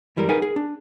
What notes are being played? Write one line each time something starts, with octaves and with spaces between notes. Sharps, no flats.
F#2 E3 G3 G#3 A#4
D#4 G#4 A#4 B4 F#5 G#5
G#4
D4